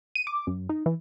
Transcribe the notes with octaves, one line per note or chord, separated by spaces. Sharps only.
D#7
D6
F#2
D#4
E3